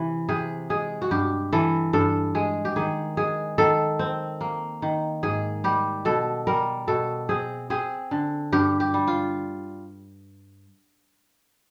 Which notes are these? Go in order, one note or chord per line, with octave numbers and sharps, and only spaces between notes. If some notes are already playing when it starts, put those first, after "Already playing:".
Already playing: C3 E3
C3 G#4
G#3 G#4
F#4
G2 G4
E3 A4
G2 A4
G#3 G#4
G4
D#3 G#4
G#3 G#4
D#3 A4
C4
A#3
D#3
G#2 G#4
G3 G4
B2 A4
G3 A#4
B2 A4
C4 G#4
C4 G#4
D3
G2 G4
G4
G3
F4